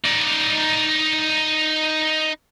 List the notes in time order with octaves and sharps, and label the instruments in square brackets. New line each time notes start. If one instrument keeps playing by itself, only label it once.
[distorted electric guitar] D#4 D5